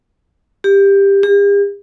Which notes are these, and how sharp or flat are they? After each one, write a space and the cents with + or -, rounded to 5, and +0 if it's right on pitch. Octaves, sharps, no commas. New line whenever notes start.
G4 +15
G4 +45